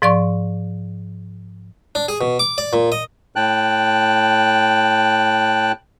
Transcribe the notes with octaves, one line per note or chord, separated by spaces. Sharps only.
G#2 F3 D5 C6 C#6
D4
G#4
B2
D6
D5
A#2
D#5
A2 G5 A5 F#6